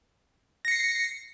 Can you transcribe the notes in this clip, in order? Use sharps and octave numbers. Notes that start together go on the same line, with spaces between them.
A#6 C7 C#7